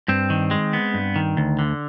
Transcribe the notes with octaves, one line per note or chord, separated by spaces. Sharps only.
G2 C4
D#3
G#3
B3
G2
D#3
D2
D3